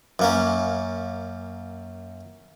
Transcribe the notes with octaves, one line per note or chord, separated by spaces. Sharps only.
F#2 A#3 C#4